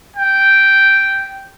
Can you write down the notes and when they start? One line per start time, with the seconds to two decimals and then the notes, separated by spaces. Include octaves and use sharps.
0.17 G5